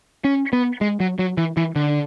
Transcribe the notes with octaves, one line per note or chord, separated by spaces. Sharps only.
C#4
B3
G#3
F#3
F#3
E3
E3
D3